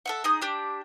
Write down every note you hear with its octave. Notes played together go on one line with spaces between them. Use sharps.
A4 E5 F#5
D#4 G#4 D#6
D4 G4